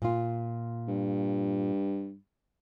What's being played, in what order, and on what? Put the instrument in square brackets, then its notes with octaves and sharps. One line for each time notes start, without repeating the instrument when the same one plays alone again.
[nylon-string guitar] A#2 F4
[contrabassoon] G2